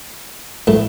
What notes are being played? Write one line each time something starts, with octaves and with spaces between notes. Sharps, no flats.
A2 A3